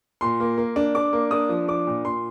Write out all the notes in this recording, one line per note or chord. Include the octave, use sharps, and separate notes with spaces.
A#2 C6
A#3
A#3
D4
D4 D6
A#3
D4 D#6
F3
D4 D6
A#2
A#2 C6